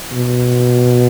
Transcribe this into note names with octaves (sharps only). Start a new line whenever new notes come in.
B2